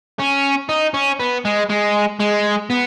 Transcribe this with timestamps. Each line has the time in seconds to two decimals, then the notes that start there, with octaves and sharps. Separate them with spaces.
0.19 C#4
0.69 D#4
0.94 C#4
1.19 B3
1.45 G#3
1.70 G#3
2.20 G#3
2.70 B3